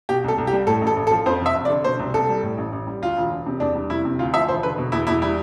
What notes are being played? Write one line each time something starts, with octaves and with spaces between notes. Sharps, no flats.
B2 G4
C2 A4
C2
G4
G3
A2 A4
A1
A4
A1
A4
F3
F2 C5
F1 E5
F1
D5
D3
B2 C5
C2
C2 A4
G3
A2
A1
A1
G3
D2 F4
E1
E1
C3
E2 D4
G3
F1 E4
C3
D2 F4
F3 E5
E1 C5
D3 B4
B2
E2 E4
E2 E4
G3 E4